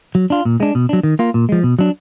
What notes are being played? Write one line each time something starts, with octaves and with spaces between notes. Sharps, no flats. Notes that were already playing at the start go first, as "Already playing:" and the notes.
F#3
D4 F4
A#2
G#3 D4
B2
F#3 D4
D#3
A#3 F4
A#2
F3 G#3
B2
F#3 D4